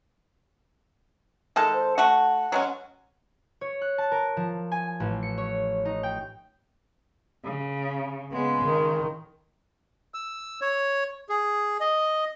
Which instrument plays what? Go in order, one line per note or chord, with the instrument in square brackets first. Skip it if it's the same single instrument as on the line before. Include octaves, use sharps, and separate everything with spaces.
[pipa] D#3 G#3 A4
[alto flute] C5
[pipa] A3 F#4 [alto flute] F#5
[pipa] F#3 G#3 C#4
[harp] C#5
F#6
A5
A#4
F3
G#5
A1
C#7
C#5
D#4
G5
[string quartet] C#3
[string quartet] C#3 G#3 [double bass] B3
[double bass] D#3
[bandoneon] E6
C#5
G#4
D#5